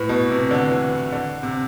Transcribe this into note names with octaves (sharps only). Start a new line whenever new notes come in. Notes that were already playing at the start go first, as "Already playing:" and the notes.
Already playing: A2 B4
B2
C3
D3
E3
D3
C3